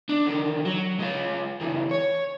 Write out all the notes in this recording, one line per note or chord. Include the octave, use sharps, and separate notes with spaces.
D4
D3 D#3
F#3
G#3 F4
C#2 E3
C#5